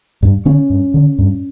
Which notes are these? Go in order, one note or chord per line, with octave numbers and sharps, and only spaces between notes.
G2
D3 C#4
G2
D3
G2